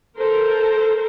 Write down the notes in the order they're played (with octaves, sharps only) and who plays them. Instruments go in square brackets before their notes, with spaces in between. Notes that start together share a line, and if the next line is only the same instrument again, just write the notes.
[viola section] A4 A#4 C5